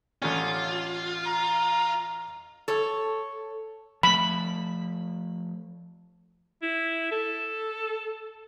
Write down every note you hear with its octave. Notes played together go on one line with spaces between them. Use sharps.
A1 D3 C#4 F4
A#5
A4 C#5
F3 A3 B5
E4
A4